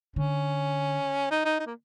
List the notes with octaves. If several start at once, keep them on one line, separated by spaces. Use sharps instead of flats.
D3 C#4
D#4
D#4
D#4
A#3